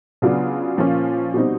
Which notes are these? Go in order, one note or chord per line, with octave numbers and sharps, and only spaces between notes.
C#3 F#3 B3 D4 F4
A#2 F3 A#3 C#4 F4
B2 G3 C4 D#4